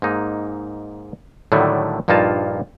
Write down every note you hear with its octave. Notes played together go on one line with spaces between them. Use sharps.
G#2 A#3 D#4
A2 D3 D#3 F#3 G3 A3
A#1 G2 A#3 D#4 F4 A5